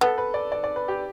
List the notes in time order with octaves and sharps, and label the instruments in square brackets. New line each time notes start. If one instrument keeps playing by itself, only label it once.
[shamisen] B3 [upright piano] A4
[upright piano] B4
D5
D5
D5
B4
G4